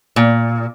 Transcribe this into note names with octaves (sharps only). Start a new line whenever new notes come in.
A#2